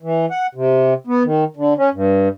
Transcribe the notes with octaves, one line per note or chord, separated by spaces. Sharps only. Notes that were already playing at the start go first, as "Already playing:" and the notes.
E3
F#5
C3
B3
D#3
D3
C#4
G2